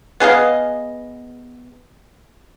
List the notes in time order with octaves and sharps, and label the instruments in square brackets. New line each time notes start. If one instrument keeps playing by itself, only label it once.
[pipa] B3 G#4 D#5 F5